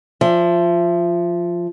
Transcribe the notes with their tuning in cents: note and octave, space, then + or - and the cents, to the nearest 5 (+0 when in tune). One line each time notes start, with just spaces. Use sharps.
F3 +0 E5 +35